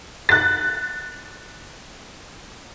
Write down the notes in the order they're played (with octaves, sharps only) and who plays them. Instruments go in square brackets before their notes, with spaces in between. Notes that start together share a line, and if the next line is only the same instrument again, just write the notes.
[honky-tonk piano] F#6 A6